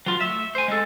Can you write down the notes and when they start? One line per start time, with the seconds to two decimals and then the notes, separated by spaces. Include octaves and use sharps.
0.06 F#3 F4
0.21 A3 E5
0.55 C5 G#5
0.68 G#3 A4